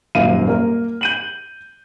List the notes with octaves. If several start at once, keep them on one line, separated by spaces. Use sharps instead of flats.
D#1 G#1 F#2 A#3 F5 D#7
A#3 A#4
G6 D#7 F#7